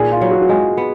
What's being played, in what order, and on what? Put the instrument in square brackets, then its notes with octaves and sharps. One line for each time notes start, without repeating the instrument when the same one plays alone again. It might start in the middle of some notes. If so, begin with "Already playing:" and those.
Already playing: [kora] A#2 D#3 [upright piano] G#4
[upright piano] F4
[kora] F#3 B3
[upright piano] F#4
F#4
[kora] G#3 [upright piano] G#4
[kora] B3